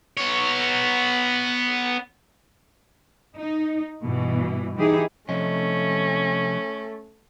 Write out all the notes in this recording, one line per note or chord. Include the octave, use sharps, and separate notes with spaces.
B3 C#5
D#4
G2 B2 E3
E3 D#4 E4 G4 G#4
C3 F3 A3 C#4 D#5